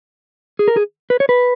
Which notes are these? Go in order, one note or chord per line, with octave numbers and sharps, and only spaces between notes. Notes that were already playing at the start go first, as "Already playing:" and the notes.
G#4
A#4
G#4
B4
C#5
B4